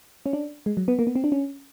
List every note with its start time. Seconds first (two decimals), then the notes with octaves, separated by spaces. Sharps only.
0.26 C#4
0.33 D4
0.66 G#3
0.77 F#3
0.88 B3
0.99 A#3
1.07 B3
1.15 C4
1.24 D4
1.32 C#4